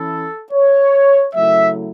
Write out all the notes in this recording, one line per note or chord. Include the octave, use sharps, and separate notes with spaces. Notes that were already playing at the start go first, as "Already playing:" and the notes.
Already playing: E3 C#4 E4 A4
C#5
C#3 F#3 A3 E4 E5